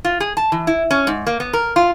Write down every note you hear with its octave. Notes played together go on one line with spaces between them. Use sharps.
F4
G#4
A5
E3
E4
C#4
G#2
A#3
B3
A#4
F4